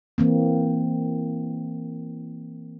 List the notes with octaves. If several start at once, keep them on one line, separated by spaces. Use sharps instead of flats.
E3 A#3 C4